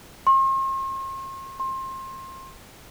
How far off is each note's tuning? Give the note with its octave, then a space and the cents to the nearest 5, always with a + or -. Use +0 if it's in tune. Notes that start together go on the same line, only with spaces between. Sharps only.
C6 +45
C6 +25